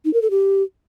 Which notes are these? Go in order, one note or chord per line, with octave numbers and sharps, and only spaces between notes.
D#4
A#4
A4
G4